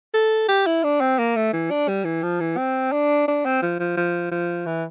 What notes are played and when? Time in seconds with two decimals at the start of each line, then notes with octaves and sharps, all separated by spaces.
0.14 A4
0.48 G4
0.66 E4
0.84 D4
1.00 C4
1.19 A#3
1.36 A3
1.53 E3
1.71 D4
1.88 G3
2.05 E3
2.23 F3
2.40 E3
2.57 C4
2.92 D4
3.28 D4
3.45 C4
3.62 F3
3.80 F3
3.97 F3
4.31 F3
4.66 E3